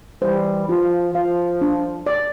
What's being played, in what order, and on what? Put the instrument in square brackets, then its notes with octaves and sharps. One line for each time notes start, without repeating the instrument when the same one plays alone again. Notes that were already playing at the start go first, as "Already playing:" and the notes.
[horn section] E3 G3 [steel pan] C5
[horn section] F3 [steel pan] F4
[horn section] F3 [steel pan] F5
[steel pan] D4
D5